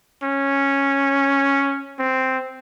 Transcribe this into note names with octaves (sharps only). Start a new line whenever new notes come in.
C#4
C4